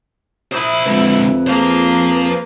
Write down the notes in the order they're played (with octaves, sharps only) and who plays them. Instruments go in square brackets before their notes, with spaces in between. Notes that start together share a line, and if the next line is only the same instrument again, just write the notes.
[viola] E4 [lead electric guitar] C5 B5 [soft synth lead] D#6
[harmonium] F2 F3 [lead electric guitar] D3 G#3 [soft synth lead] B4
[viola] A#3 G#4 [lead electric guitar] C5 F5